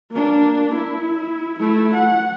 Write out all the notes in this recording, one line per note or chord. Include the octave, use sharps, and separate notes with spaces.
A#3 D4
E4
A3 E4
F#5